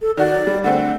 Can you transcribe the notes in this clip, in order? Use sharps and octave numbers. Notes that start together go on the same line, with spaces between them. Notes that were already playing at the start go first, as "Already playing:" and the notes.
A4
D#3 F#4 D5
F#3
G3
D3 A3 C4 F#5